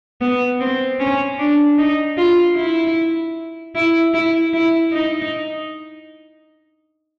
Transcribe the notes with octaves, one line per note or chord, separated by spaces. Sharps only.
B3
C4
C#4
D4
D#4
F4
E4
E4
E4
E4
D#4